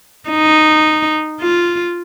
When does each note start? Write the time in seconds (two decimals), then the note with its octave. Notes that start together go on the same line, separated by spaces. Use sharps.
0.29 D#4
1.41 F4